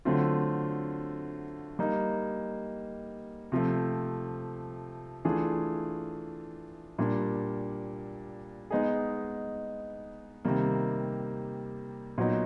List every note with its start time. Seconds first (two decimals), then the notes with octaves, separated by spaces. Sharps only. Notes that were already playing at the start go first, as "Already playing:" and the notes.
0.05 D3 F#3 A3 C4 F4
1.79 G3 A#3 D#4
3.52 C3 F3 A3
5.25 E3 A3 D4 F4 G#4
6.98 A#2 G3 A#3 D4
8.70 G#3 B3 D#4 G#4
10.45 C3 D#3 G3 A#3
12.18 A#2 F#3 B3 D#4